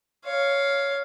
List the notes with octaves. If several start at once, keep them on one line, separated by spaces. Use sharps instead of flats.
C#5 F5